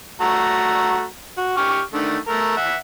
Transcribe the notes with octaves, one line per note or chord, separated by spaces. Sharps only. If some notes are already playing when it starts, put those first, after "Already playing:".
A3 F#4 A#5
F#4
G4 C#6 F6
D3 D#3 A3
A3 A#4
E5 F#5